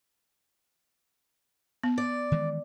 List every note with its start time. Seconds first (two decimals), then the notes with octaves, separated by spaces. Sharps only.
1.83 B3
1.98 D5
2.32 D#3 E3 G#3